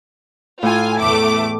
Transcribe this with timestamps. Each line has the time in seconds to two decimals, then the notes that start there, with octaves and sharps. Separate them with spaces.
0.63 A2 F4 G#5
1.00 E2 A3 D6